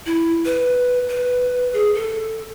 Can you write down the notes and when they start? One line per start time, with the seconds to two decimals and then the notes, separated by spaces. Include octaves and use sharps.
0.06 E4
0.45 B4
1.09 B4
1.74 G#4
1.94 A4